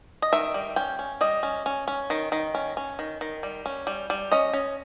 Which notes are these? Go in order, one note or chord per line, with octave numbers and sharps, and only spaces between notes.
D#5
D#3 E5
G3
C#4 G5
C#4
G3 D#5
C#4
C#4
C#4
D#3
D#3
C#4
C#4
D#3
D#3
G3
C#4
G3
G3
C#4 D#5
C#4